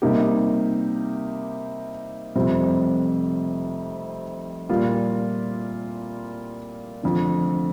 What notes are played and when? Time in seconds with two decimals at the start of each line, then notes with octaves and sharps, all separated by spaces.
0.02 C3 G3 A#3 D#4 G4
2.35 F1 F2 C3 G3 C4
4.69 A#2 G3 A#3 F4
7.03 F1 F2 D3